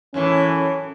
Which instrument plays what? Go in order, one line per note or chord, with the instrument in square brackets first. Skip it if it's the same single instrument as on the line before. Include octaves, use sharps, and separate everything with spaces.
[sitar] F#2 A2 E3 [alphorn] C#4